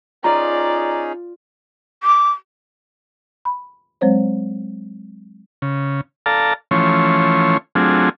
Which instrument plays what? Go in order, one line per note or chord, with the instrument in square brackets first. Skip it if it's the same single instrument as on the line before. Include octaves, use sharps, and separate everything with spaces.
[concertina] C#4 D#4 G#4 [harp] F4 [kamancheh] D5 [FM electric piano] A#5
[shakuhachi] D6
[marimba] B5
F#3 G#3 C4 C5 C#5
[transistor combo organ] C#3
A4 D5 F5 A5 A#5
E3 F3 A3 C#4 C#5 C6
F#3 A3 C4 D4 F4 G#4